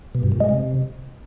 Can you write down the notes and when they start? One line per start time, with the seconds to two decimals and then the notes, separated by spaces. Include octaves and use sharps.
0.15 B2
0.23 G2
0.32 A#2
0.40 G#3
0.49 C3